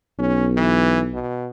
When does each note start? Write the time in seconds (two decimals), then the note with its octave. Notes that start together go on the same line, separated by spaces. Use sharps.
0.19 B1 C#4
0.57 E3
1.13 B2